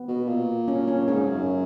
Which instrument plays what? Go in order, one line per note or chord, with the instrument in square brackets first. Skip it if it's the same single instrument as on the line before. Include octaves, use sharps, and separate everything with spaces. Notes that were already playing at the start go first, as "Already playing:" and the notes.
Already playing: [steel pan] B3
[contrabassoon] B2
A#2
[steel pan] C#4
C#4
[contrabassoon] G#2 [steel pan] C#4
[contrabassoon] F#2